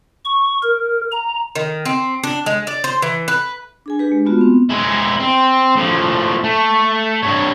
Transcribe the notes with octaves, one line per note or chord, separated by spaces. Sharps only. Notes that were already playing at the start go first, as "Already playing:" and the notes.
C#6
A#4
A#5
D#3
C4
D4
G#3
D5
C5
E3
B4
D4 G#4 G#5
D4 G4 B4
G#3
G#3 A3 B3 F4 F#4
B3 C4
G#3 E4
C4
A2 F3
A3
G2 C#5